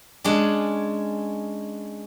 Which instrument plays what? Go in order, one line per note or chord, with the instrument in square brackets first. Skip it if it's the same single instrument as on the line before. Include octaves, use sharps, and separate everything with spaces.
[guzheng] G#3 C#4 D4